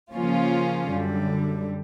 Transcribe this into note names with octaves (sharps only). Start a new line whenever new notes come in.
C#3 F3 A#3 C#4 F4
F#2 D3 G3